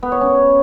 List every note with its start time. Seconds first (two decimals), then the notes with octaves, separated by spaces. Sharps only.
0.03 B3
0.12 C#5
0.21 C#4